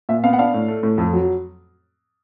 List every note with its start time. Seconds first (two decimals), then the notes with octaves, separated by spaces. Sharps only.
0.09 A#2 E5
0.24 B3 F5
0.33 F#5
0.39 D4 F5
0.54 A2
0.68 A3
0.83 A2
0.98 F2
1.13 F#3